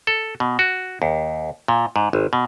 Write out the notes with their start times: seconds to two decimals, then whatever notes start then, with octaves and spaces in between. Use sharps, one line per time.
0.07 A4
0.40 B2
0.59 F#4
1.02 D#2
1.68 A#2
1.96 G#2
2.13 G#1
2.33 B2